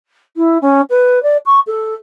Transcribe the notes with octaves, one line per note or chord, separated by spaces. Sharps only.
E4
C#4
B4
D5
C#6
A4